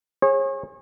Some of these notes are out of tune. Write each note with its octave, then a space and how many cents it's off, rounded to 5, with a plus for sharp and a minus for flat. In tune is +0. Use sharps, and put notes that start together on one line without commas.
G#4 -20 C#5 -35